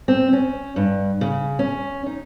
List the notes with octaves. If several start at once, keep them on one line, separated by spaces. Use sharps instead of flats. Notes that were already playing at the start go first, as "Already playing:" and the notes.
C4
C#4
G2
C#3
C#4
D#4